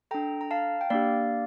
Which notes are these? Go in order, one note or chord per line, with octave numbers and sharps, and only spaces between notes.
D4 A4 G5 A#5
A#5
F5 A5
G5
A#3 D4 G4 D5 F5